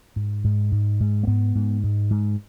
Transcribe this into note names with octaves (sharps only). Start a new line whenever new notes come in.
G#2
G#2
G#2
G#2
A#3
G#2 B3
G#2
G#2
G#2